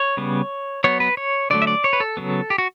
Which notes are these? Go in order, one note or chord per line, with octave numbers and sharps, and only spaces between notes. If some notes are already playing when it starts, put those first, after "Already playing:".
Already playing: C#5
C#3 G3 B3
F#3 B3 C#5
B4
C#5
D3 F#3 A3 D5
E5
D5
C#5
B4
A4
C#3 F#3 B3
G4
F#4